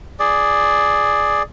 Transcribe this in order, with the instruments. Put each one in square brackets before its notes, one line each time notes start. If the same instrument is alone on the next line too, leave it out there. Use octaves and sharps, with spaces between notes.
[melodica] G#4 D5